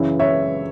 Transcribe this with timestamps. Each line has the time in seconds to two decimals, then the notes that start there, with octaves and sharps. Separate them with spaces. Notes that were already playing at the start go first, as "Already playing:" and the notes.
Already playing: F#2 C#3 E3
0.20 C#5 E5